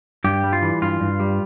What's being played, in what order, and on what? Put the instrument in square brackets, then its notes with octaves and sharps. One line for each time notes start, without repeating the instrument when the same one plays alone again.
[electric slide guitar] G2 G4
G3
F4
E3
G2 F4
G2
G3